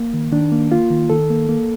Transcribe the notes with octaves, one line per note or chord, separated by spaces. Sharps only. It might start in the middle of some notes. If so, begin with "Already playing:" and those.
Already playing: A#3
D#3
D#3 D4
A#3
A#3 F4
D#3
D#3 A4
A#3
A#3